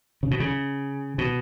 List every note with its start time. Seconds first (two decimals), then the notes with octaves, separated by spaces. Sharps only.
0.23 C#3
0.31 B2
0.40 C#3
1.18 B2